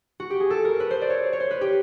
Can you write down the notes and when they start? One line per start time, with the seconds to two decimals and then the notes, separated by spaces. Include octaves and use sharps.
0.20 F#4
0.30 G4
0.40 G#4
0.50 A4
0.65 A#4
0.80 B4
0.91 C5
1.01 D5
1.10 C#5
1.33 C#5
1.40 C5
1.51 B4
1.61 G4